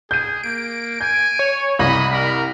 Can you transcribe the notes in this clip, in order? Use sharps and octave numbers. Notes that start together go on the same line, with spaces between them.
G#4 G6 D#7
A#3 D7
G#5 G6
C#5
C2 D#5 B5
A#4